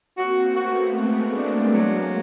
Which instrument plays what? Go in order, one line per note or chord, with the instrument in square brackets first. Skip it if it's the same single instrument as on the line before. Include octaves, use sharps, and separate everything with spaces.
[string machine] A#3 C4 [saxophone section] F#4
[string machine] A3 B3 [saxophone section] F#4
[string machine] G#3 A#3 [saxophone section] F#4
[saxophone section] D4
[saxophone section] F#3 [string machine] G#3 A#3